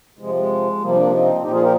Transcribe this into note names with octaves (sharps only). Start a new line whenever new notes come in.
C3 F3 G#3
G#3
C3 F3 G3 A#3
A#3 D4
C4 D#4
A#2 F3 D#4 G4
F4 G#4
G4 A#4